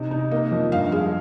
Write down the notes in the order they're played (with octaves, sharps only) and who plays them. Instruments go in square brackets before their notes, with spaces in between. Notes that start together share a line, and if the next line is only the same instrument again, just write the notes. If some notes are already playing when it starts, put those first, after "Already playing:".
Already playing: [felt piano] C3 D#4
D#4
A#3 D#5
F2
G2 F5
G#3 F5